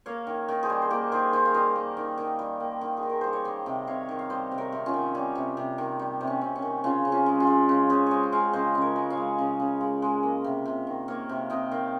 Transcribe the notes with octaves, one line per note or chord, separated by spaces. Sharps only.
A#3 C#5 F5
D#3
D#3
G#4 C5
G3
C5
A#3 G4 A#4
D#3 G#4 C5
D#3 C5 D#5
F5
G3 C5 D#5
A#3
D#3
D#3
G3
A#3
D#3
G#4
D#3
A#4
G3 C5
C#5
G3 C5 D#5
C3
C3 C#5 F5
D#3
F5
G3 C5 D#5
C3
A#4 C#5
C3
C#4 F4
D#3
G3 C#4
C3
C3
D#3
G3
C3
C#4
C3
C#4
D#3
C#3 C#4 F4
C#3
C#4 F4
G#3
C#4 F4
G#3
C#3
C#3 G#4 C5
G#3 C5 C#5 D#5
G5
G#3 C#5 F5
C#3 C5 D#5
C#3
A#4 C#5
G#3
C#5 F5
G#3
C#3
C#3
G#3
G#3
A#3
C3
C3
D#3
A#3 C#5 F5
C3
C3 D#5 G5
D#3 C#5 F5